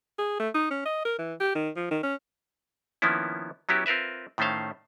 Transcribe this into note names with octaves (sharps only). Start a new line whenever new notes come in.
G#4
A3
D#4
C#4
D#5
A#4
E3
G4
D#3
F3
D#3
C#4
D#3 F3 A#3 B3 C#4 E4
F#3 B3 C#4 E4 F#4 G4
C4 F4 A#4 B4 E5
A2 D#3 A3 C#4 C5 F5